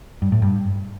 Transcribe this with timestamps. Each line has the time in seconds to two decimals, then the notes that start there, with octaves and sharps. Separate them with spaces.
0.22 G2
0.32 A2
0.42 G2